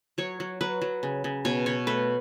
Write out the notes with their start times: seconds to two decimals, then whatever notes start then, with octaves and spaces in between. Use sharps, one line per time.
0.18 F#3 C#5
0.40 F#3
0.61 F#3 B4
0.82 F#3
1.03 C#3
1.24 C#3
1.45 B2 C#5
1.66 B2 C#5
1.87 A3 B4